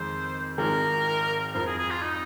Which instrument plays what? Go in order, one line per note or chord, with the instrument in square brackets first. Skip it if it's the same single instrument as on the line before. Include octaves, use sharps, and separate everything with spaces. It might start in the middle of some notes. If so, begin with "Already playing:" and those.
Already playing: [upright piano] F2 D#3 G#3 C4 D#4 [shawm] C5
[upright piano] G#1 G#2 F3 G#3 [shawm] A#4
[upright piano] F2 F3 C4 [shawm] A#4
[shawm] G#4
G#4
F4
D#4